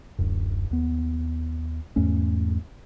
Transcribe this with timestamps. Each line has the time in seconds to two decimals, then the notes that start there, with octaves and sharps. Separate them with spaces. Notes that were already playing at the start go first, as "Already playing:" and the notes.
0.18 D1 F#2
0.71 D#2 B3
1.96 E2 G#2 A3 C#4